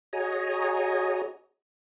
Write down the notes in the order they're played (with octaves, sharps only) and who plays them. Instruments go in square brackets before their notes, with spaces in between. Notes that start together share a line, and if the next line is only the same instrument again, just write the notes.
[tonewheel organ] F#4 G#4 C#5 D#5 G#5 A#5